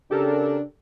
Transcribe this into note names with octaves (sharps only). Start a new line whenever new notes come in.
C#3 D4 G4 A4 A#4